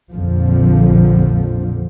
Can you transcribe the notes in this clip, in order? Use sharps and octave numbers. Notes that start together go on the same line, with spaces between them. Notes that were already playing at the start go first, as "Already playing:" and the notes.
A#1 F2 D3 F3